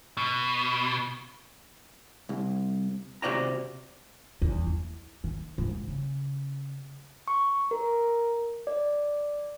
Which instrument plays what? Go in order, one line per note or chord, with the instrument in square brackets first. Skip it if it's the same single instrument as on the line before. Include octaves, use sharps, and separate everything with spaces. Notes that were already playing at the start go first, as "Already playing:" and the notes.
[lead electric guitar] B2
[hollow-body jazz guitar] C2
C3 F#4 C5 D5 G5 A#5
[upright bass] G1 E2
E4
D#3
F2 G#2
C#3
[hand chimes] C#6
A#4
D5